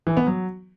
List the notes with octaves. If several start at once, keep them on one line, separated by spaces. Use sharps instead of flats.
E3
B3
F#3